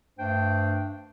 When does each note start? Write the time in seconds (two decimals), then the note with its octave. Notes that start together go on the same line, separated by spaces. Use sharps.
0.18 G2 A3 D4 C5 G5